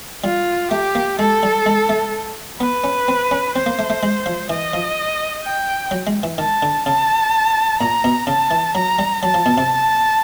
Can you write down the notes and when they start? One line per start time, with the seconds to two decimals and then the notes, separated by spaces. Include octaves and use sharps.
0.24 G3 F4
0.71 A3 G4
0.95 A#3
1.19 G#3 A4
1.43 G3
1.66 G#3
1.89 A3
2.60 B3 B4
2.84 C#4
3.08 C4
3.31 C#4
3.55 C4 C5
3.66 A#3
3.79 A3
3.90 A3
4.03 G#3
4.26 F3
4.50 E3 D#5
4.73 F3
5.44 G5
5.91 F#3
6.07 G#3
6.23 E3
6.38 D#3 A5
6.63 D3
6.86 C#3 A5
7.80 A#2 A#5
8.04 B2
8.27 C#3 A5
8.51 E3
8.75 F#3 A#5
8.99 G3
9.22 F#3 A5
9.34 F3
9.46 B2
9.58 C3